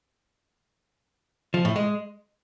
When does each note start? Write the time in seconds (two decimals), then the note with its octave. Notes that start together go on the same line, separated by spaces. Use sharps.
1.54 F3
1.65 A2
1.76 G#3